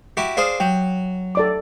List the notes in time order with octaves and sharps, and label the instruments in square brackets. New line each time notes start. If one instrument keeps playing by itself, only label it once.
[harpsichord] E4 F#4 G4
[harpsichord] D4 G#4 C5 [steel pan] F5 D#6
[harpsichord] F#3 [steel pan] G5
[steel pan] A4 D5 D6